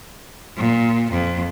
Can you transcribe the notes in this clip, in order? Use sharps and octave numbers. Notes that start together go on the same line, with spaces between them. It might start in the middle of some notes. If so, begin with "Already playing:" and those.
A#2
F2